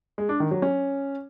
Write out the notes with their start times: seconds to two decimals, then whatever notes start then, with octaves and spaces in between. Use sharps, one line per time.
0.18 G#3
0.29 D4
0.40 D#3
0.51 F#3
0.62 C#4